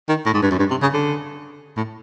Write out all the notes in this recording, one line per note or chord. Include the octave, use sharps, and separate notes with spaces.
D#3
A2
G#2
G2
F#2
G2
C3
C#3
D3
A2